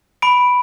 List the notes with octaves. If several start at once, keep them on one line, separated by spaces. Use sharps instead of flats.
B5 D7